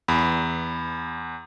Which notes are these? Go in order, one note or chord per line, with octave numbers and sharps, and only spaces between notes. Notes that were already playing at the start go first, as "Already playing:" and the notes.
E2 B5